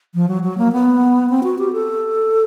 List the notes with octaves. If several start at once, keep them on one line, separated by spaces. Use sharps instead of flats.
F3
F#3
F#3
A#3
B3
C4
F#4
G4
A4